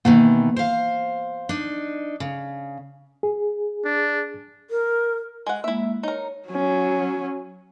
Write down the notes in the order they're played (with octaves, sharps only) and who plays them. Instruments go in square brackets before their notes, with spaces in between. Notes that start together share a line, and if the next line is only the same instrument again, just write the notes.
[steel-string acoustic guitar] B2 D#3 E3 [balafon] A#3
[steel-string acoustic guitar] C5 F5
D4 D#4
C#3
[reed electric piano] G#4
[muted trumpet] D4
[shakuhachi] A#4
[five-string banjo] G#3 F#5
[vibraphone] G#3 A#3 [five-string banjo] E4 E5
[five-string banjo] D#4 A#4 [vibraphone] C#5
[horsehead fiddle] F#3 C#4